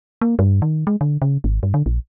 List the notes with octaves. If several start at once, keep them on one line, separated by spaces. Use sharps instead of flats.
A#3
G2
D#3
G#3
D3
C#3
G#1
G2
D3
A#1